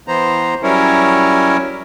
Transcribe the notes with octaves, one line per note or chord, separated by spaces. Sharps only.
E3 B3 C5 A#5
F#3 G3 C#4 E4 A#4 C#5